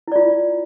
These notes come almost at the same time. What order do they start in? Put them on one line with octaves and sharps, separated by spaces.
E4 D5 F4